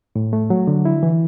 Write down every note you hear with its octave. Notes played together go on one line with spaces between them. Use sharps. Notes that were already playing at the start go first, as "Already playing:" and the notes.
A2
A3
F#3
D3
E4
E3